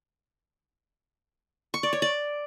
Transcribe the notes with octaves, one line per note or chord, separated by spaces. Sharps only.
C#6
D5
C#5
D5